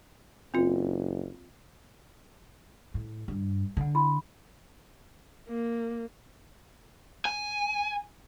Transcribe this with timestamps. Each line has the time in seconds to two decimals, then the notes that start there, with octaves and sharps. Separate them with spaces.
0.54 F#1 C4 F4
2.94 A2
3.28 G2
3.77 D3 D4 F#5
3.95 E4 B5 C6
5.48 A#3
7.25 G#5